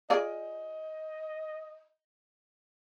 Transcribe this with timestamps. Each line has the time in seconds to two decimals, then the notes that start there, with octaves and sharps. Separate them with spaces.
0.10 F4 G#4 D5 D#5